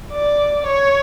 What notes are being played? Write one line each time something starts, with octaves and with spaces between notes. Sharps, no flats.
D5
C#5